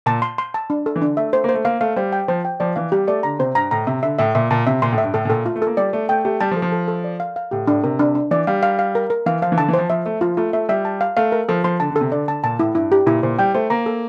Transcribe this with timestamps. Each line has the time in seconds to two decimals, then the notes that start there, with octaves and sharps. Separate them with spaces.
0.06 A#2 A5
0.22 C6
0.38 C6
0.54 A5
0.70 D4
0.86 A4
0.96 E3
1.02 D3 D4
1.17 A3 E5
1.33 A3 C5
1.44 A#3
1.49 C5
1.54 A3
1.65 A#3 F5
1.81 A3 F5
1.96 G3 C5
2.13 G5
2.28 F3 C5
2.45 G5
2.60 F3 D5
2.76 E3 F5
2.92 G3 G4
3.07 A3 D5
3.23 D3 A#5
3.39 C3 C5
3.55 G2 A#5
3.71 A2 A#5
3.87 C3 E5
4.03 D3 E5
4.19 A2 E5
4.35 A#2 E5
4.51 A#2 A5
4.67 C3 E5
4.82 A#2 C6
4.92 A2
4.98 E5
5.04 G2
5.14 A2 A4
5.25 A2
5.30 A#2 A4
5.46 A3 F4
5.56 A3
5.62 A#3 A4
5.77 G3 D5
5.93 A3 D5
6.09 A3 G5
6.25 A3 G4
6.41 G3 A5
6.51 F3
6.56 A4
6.62 F3
6.72 A4
6.88 A4
7.04 D5
7.20 F5
7.36 F5
7.51 A2 G4
7.67 A2 D4
7.84 C3 A#4
7.99 D4
8.15 D4
8.31 E3 D5
8.47 G3 F5
8.63 F5
8.79 F5
8.95 A#4
9.10 A#4
9.26 E3 F5
9.42 F3 F5
9.52 E3
9.57 D3 A5
9.69 E3
9.73 C5
9.79 F3
9.89 F3 E5
10.06 A3 E5
10.21 F3 F4
10.37 A3 F4
10.53 A3 E5
10.69 G3 E5
10.85 A5
11.01 F5
11.17 A3 F5
11.32 A#4
11.49 F3 A4
11.64 F3 C6
11.80 D3 A5
11.90 D3
11.96 A4
12.01 C3
12.11 D3 D5
12.28 D3 A5
12.44 A#2 A5
12.59 A2 E4
12.75 G2 E4
12.92 G4
13.06 A#2 E4
13.23 A#2 C5
13.39 G3 G5
13.54 A3 C5
13.70 A#3 A#5
13.86 A4